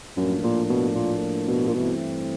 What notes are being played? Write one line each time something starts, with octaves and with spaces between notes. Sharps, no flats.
F#2 A2 F3 A#3 D4
A#2
B2
A#2
B2
A#2
G2 B2 E3 A3 C4 E4